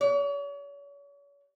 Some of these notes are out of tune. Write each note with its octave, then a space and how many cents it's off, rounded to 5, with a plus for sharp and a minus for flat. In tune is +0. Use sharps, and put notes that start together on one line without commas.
C#5 +40